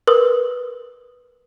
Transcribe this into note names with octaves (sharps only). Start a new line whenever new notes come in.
A#4 B4 D#6